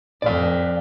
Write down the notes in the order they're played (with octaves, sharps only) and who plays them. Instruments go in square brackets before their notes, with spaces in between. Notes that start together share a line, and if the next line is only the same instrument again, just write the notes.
[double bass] F2 [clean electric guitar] D5 F5